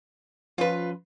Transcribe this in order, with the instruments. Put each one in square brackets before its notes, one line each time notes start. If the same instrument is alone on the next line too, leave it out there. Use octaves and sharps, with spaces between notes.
[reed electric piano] F3 C#4 [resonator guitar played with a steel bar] F4 B4